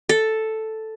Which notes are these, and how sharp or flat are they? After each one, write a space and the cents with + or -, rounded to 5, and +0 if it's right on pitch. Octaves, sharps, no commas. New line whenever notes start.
A4 +0